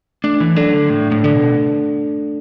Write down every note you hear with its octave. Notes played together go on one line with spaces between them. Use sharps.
A3 D4
E3
F#3 D4 A4 D5
D3
A2 A3
A2
D3 D4 A4 D5
B2